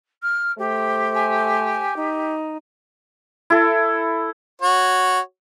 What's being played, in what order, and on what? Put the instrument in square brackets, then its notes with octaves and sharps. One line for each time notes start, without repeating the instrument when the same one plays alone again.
[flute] F6
[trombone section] A3 C5 [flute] G4
[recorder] G#5
D#4
[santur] E4 A4
[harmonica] F#4 C#5